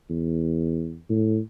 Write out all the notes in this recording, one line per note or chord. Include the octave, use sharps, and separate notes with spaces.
E2
A2